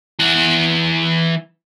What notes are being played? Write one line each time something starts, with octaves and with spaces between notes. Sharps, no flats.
E3 F#5